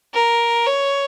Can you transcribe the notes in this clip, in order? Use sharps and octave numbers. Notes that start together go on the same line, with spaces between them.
A#4
C#5